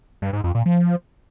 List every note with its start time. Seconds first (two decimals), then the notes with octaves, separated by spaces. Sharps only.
0.22 G2
0.33 G#2
0.44 F2
0.55 A#2
0.66 F3